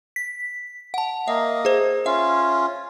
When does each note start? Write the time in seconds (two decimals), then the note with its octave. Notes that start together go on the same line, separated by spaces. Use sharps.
0.16 B6
0.94 F#5 A5
1.28 A#3 D#5 E5
1.65 G#4 C5
2.06 C#4 F4 E5